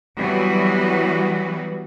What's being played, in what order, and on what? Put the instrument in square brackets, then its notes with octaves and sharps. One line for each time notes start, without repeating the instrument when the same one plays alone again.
[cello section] E3 F#3 G3 B3 F#4 B4